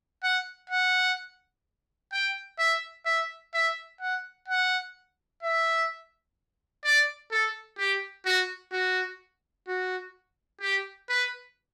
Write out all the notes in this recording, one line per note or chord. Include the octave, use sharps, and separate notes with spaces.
F#5
F#5
G5
E5
E5
E5
F#5
F#5
E5
D5
A4
G4
F#4
F#4
F#4
G4
B4